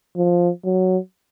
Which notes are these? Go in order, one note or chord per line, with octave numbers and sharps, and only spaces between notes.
F3
F#3